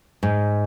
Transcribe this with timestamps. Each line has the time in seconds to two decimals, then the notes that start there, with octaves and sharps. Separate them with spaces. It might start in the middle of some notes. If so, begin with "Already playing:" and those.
0.23 G#2